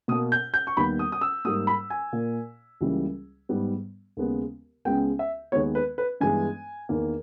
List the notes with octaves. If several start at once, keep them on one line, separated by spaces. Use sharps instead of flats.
B2 A#3 D#6
G6
G6
C#6
D#2 D#3 G3 B3 B5
D#6
D#6
E6
G#2 G3 A#3 D#6
B5
G#5
A#2 A#3
C#2 C#3 E3 G3 A#3
G#2 G3 B3
D#2 C#3 G#3 B3
C#2 C#3 G#3 B3 G5
E5
D#2 D#3 G#3 B3 C#5
B4
B4
G2 E3 G#3 B3 G#5
E2 D#3 A#3